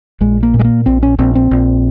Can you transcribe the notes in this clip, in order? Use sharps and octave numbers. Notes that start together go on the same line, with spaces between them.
A#1 G#3
A#3
A#2
G#3
A#3
A#1 C4
C#4
A#1 C4
C4
A#1